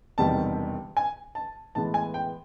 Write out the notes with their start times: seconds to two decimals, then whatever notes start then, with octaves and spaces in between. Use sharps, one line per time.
0.18 E1 E2 C3 D#3 G3 A5
0.97 G#5
1.35 A5
1.75 A2 E3 G#3 B3 A5
1.94 G#5
2.14 G5